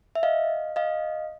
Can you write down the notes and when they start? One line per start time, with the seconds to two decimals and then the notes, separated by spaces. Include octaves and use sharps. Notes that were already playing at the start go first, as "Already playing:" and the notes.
0.15 E5
0.23 D#5 F5
0.76 D#5 F5